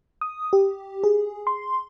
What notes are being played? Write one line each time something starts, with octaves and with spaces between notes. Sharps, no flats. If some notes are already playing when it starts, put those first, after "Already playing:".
D#6
G4
G#4
C6